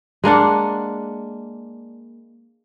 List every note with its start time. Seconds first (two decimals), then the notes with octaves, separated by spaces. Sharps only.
0.24 G#3 A#3 D4 F#5